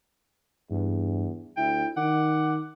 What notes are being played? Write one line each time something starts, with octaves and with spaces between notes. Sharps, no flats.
E2 G2
D2 E4 G5
D#3 F#5 D6